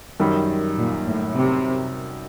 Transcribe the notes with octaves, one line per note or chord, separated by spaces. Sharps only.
F#2 D#3 G3
A#2
A2
C3